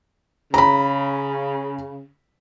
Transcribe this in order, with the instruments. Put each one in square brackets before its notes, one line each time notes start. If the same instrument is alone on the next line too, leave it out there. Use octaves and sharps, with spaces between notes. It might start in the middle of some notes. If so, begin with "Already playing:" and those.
[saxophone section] C#3 [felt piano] A#5 B5